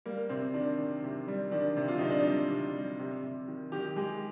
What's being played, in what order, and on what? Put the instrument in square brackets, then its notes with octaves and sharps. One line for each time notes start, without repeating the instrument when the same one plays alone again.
[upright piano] G3 A#3
C3 C4
D#3 D4
D#3
C3
G3
D#3 D4
C3
F4
C3 D#4
D4
D#4
G3
C3
G3
C3
C3
D#3
D#3 G4
G#3 G4